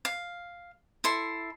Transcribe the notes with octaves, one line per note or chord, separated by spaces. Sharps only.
F5
E4 A4 C6